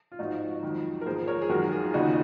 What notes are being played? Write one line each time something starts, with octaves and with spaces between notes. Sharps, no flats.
F4
G#2 F3 D#4 F#4
F2 D#3 F#3
A#4
G#2 F3 G#4 C5
A#4 C#5
G#4
F#2 D#3 F#3 F#4 A#4
F4 G#4
D#2 C#3 F3 D#4 F#4